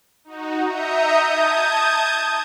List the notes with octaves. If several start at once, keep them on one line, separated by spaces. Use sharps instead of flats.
D#4 F#4
D#5 E5 A#5 D#6 G6 C#7
A5 D#6 G6 G#6